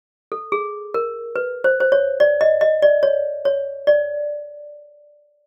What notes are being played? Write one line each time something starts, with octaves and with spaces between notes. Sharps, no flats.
A4
G#4
A#4
B4
C5
C5
C#5
D5
D#5
D#5
D5
C#5
C#5
D5